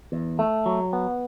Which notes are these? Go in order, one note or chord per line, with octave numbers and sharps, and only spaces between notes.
E2
A3
F#3
B3